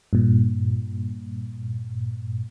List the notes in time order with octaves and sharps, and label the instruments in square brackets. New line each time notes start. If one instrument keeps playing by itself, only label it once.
[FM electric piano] G2 A#2